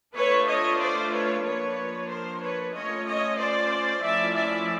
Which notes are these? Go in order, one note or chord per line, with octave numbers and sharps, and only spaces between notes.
A3 D4 F4 B4 C#5
C#5 D#5
C5 D5
B4 C#5
F3 A#3 D4 B4 C#5
A#4 C5
B4 C#5
A3 C#4 F4 C#5 D#5
C#5 D#5
C5 D5
F3 A3 C#4 E4 D5 E5
D5 E5